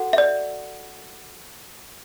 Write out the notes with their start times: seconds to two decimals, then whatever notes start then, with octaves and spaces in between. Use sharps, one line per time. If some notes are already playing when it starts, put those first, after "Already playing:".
Already playing: F#4 A4 F#5
0.13 E5
0.18 D5